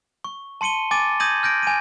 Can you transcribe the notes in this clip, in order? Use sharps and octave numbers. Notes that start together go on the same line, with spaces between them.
C#6
A5 C6 C#7 D#7 G7
G#5 D6 A6 D#7 G7
D#6 G6 G#6 A#6 D#7 F#7
F6 G6 A#6 D7
G#5 D#7